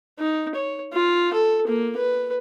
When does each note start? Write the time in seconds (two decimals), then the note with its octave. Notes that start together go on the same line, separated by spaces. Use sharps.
0.19 D#4
0.55 C#5
0.93 F4
1.33 A4
1.67 A#3
1.97 B4